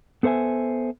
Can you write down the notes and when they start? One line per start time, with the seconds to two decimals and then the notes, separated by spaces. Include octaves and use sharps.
0.23 B3 A4 C5 E5 G#5